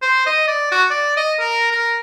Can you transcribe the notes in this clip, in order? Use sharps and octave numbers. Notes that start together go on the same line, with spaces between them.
C5
D#5
D5
F#4
D5
D#5
A#4
A#4